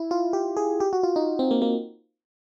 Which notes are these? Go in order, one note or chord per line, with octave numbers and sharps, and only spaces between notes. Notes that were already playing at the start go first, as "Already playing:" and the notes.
Already playing: E4
F4
G4
G#4
G4
F#4
F4
D#4
C4
A#3
A#3